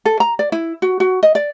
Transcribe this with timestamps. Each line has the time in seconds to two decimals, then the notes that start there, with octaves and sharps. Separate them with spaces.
0.05 A4
0.20 A#5
0.39 D5
0.52 E4
0.82 F#4
1.00 F#4
1.23 D#5
1.35 D5